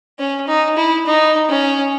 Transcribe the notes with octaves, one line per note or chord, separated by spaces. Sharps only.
C#4
D#4
E4
D#4
C#4